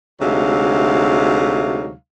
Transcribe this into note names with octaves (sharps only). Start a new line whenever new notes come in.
D2 C3 F#3 G#3 D#4 F5